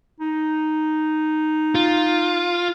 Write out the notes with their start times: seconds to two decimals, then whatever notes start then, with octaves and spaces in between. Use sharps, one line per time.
0.20 D#4
1.75 F4